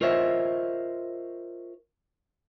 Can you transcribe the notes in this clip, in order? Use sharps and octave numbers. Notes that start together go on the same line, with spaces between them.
F4 A#4 C5 C#5 D#5 E5